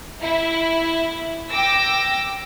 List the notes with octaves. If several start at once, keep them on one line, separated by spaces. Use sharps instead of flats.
E4
G5 D6 E6 A#6